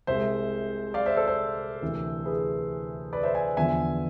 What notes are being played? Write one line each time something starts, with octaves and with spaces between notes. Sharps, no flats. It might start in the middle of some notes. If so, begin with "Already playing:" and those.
C2 C3 G#3 C5 E5
D5 F5
C5 E5
A4 C5
A4 C5
D2 C3 E3
G#4 B4
B4 D5
C5 E5
E5 G#5
E2 D3 F3 B3 E5 G#5